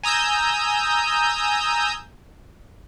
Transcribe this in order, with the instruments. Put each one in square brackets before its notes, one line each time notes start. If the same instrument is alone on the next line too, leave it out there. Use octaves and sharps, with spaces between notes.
[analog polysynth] G#5 A#5 D#6 E6 G6